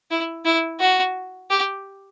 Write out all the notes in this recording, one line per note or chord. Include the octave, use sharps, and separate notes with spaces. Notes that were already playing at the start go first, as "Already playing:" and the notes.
E4
E4
F#4
G4